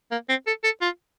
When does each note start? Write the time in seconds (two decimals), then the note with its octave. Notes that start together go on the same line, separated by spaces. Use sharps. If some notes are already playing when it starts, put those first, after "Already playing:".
0.11 A#3
0.29 C4
0.47 A4
0.64 A4
0.81 F4